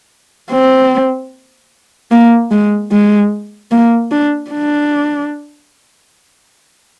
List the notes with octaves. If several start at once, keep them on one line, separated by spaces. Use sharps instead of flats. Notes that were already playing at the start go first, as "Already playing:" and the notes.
C4
A#3
G#3
G#3
A#3
D4
D4